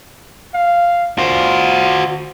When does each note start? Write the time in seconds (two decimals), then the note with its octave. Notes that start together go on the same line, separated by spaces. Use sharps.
0.54 F5
1.18 F4 F#4 C5